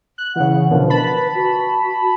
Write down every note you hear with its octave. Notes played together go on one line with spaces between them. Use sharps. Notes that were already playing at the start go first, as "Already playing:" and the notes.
F#6
C#3 E3 F#5
B2 D3 F3 A#4
B4 A5 B5
F#4